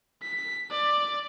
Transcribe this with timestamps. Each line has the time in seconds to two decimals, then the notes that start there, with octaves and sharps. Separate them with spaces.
0.23 B6
0.71 D5